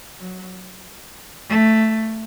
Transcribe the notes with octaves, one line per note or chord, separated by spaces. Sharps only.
F#3
A3